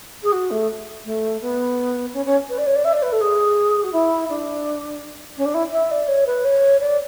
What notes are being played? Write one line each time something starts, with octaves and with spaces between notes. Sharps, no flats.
G#4
F#4
A3
A3
B3
C#4
C#4
B4
D5
C#5
D5
E5
D5
B4
A4
G#4
F#4
E4
D4
C#4
D4
E4
E5
D5
C#5
B4
C#5
D5